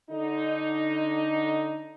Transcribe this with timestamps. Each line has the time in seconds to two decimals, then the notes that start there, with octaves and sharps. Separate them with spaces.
0.10 D3 D#4